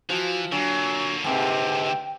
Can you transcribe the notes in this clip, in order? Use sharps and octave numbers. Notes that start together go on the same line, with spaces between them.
E3 F3 F#4
D3 F#3 A#3 D4 G#5
G#2 C3 B4 G5